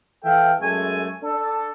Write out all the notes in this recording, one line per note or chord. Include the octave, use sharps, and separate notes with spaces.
E3 A4 E5 F5 G5
F#2 G#3 A3 A4 G#5
D4 A4